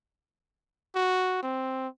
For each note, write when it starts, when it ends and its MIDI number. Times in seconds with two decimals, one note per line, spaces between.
0.95 1.41 66
1.43 1.88 60